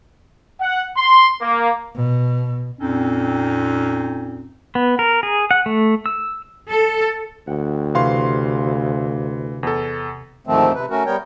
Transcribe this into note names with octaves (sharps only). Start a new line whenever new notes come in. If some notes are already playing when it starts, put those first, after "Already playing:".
F#5
C6
A#3
B2
F2 A#2 C4 C#4 D#4
B3
A#4
G#4
F#5
A3
E6
A4
D2 F#5 G5
C3 E3 F5 C6 C#6 E7
E2 A4
D2 G#2 D#3 F3 A3 C4
C3 B4
A3 C#4 F#4 A#4
G3 B3 A#4 C#5 G5